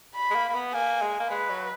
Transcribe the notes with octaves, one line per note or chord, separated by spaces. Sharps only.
B5
G#3
A#3
A#3
B3
A#3 G#5
G#3
A#3
G#3 B4
F#3